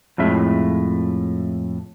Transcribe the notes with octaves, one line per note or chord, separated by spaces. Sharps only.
F2 A2 G#3 E5